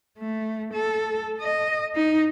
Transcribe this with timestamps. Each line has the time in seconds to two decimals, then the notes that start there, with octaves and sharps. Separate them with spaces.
0.18 A3
0.73 A4
1.41 D#5
1.96 D#4